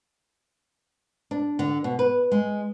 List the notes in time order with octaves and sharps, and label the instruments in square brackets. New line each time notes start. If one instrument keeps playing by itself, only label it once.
[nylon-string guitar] D4
D3
B2
B4
G#3